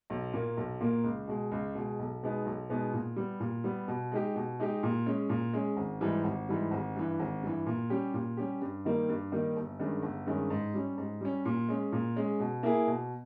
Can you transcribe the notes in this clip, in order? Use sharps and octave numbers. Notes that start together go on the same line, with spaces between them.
B1
A#2 A#3
B1
A#2 A#3
C#2
B2 G#3
C#2
B2 G#3
B1
B2 G#3 B3 D#4
B1
B2 G#3 B3 D#4
A#2
G3 B3
A#2
G3 B3
B2
G#3 D#4 G4
B2
G#3 D#4 G4
A#2
G#3 C#4
A#2
G#3 C#4
G#1
G#2 E3 G3
G#1
G#2 E3 G3
G#1
G2 E3
G#1
G2 E3
A#2
G3 C#4 G4
A#2
G3 C#4 G4
G2
D#3 G3 A#3 D#4
G2
D#3 G3 A#3 D#4
G1
G2 D#3 G#3 C#4
G1
G2 D#3 G#3 C#4
G#2
G3 C#4
G#2
G3 C#4
A#2
G#3 C#4
A#2
G#3 C#4
B2
A#3 E4 G#4
B2